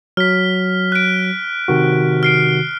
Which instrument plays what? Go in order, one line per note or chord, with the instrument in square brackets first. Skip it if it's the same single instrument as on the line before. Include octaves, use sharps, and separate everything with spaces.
[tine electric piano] F#3 [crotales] F6 B6
[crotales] F#6 D7
[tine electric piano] C3 D#3 F#4
[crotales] F6 C7 D7